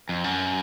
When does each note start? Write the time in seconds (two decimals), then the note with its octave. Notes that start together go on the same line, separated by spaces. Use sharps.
0.09 F2
0.24 F#2